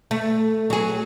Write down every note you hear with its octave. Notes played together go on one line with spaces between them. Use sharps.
A3
F#3 G#4